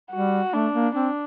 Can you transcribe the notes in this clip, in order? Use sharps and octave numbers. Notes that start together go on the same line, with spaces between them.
G3 F#4
A3 D4
A#3
C4 D4